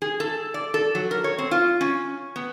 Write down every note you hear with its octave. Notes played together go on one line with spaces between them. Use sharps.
G#4
A4
D5
A4
F#3
A#4
C#5
C4
F4
C#4
B3